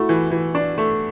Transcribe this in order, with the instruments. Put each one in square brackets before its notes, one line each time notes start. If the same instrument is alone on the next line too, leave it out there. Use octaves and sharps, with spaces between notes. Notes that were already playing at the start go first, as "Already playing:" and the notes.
Already playing: [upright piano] A3 [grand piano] E4 F#4
[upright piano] E3
E3
D4
A3